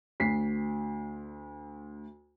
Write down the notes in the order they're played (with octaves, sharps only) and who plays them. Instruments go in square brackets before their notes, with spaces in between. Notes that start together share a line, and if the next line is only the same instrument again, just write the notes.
[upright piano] D2 B6 C7